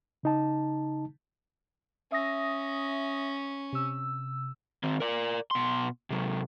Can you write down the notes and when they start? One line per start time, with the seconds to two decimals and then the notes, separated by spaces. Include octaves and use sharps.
0.23 C#3 D#4 A5
2.12 C#4 E5 D#6 A#6
3.73 C3 E6
4.83 D#3 C4
5.00 A#4 D5
5.51 B2 C6
6.10 C3 F#3